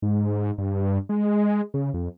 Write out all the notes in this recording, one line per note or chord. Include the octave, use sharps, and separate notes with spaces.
G#2
G2
G#3
C#3
F2